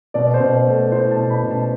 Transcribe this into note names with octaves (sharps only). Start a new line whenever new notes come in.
B2 D5
C5
B2
C5
A3
E4 C5
A5
B2
B5
B2
A5